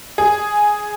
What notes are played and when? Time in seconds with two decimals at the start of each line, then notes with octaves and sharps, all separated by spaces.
0.18 G#4